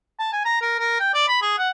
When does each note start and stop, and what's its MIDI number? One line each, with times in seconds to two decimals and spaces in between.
0.20 0.30 81
0.33 0.43 80
0.45 0.59 82
0.62 0.74 70
0.79 0.99 70
1.00 1.11 79
1.14 1.26 74
1.28 1.38 83
1.42 1.56 68
1.58 1.70 78